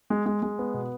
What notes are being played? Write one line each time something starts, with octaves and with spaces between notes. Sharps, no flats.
G#3
G#3
G#3
B3
B2